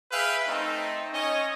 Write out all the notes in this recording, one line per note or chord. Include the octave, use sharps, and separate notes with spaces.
G#4 B4 E5 F5 G5
A3 C4 D#4
C#4 C#5 D#5